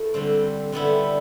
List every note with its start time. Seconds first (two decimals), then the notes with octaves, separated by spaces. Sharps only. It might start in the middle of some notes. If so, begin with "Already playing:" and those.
Already playing: A3 E4
0.14 D3 G3 C4
0.72 D3 G3 B3 E4